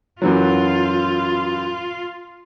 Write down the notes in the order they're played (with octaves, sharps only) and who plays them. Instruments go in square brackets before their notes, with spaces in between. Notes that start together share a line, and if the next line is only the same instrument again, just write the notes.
[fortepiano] F#2 E3 F#3 [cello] F4